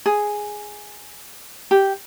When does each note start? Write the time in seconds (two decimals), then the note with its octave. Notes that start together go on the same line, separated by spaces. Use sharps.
0.06 G#4
1.71 G4